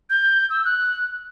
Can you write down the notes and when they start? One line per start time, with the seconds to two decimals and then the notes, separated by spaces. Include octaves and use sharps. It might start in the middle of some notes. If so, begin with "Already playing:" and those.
0.10 G6
0.50 E6
0.65 F#6